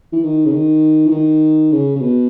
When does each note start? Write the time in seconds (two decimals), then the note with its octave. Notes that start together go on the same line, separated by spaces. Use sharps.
0.12 E3
0.23 D#3
0.45 C#3
0.52 D#3
1.06 E3
1.11 D#3
1.72 C#3
1.96 C#3
2.01 B2